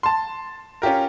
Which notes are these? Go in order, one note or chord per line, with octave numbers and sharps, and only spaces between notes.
A5 C6
C#4 F4 G4 A#4